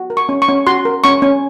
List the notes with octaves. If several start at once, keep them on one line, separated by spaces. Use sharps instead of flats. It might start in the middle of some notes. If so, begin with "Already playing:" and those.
Already playing: F#4
A#4
C#6
C#4
C#6
C#4
F#4 C6
A#4
C#4 C#6
C#4